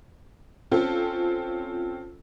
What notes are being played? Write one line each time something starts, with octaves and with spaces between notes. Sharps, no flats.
C4 C#4 F4 A4